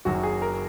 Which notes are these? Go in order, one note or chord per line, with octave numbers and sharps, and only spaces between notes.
F#1 F#2 D#3 F#3 F#4
G#4
A#4